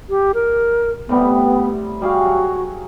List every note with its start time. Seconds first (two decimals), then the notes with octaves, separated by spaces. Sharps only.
0.10 G4
0.34 A#4
1.09 A2 C3 G3 B3
2.02 G3 F#4 G#4 F5
2.26 F#3